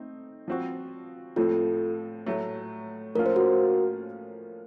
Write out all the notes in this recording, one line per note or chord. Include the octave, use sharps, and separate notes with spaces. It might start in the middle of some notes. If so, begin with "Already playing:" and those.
Already playing: A3 C4 D#4
F3 C4 F#4
A2 F3 C4 F4 A4
A2 F#3 A3
A2 F3 A#3 C#4 F4 A#4
C5
F#4 A#4